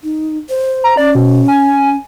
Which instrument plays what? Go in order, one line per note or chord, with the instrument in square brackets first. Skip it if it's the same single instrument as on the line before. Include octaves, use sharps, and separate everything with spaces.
[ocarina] D#4
C5
[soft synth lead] A#5
[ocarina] C#4 [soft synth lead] D5
[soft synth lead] B2
G#5